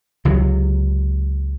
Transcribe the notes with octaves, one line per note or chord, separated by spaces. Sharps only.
C#2 C3 F#3